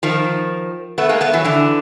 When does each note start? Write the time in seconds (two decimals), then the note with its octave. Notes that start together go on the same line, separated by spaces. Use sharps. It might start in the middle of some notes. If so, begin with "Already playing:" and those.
0.03 D#3 F3
0.98 A3 B3
1.09 G#3 A#3
1.21 A3 B3
1.33 E3 F#3
1.44 D3 E3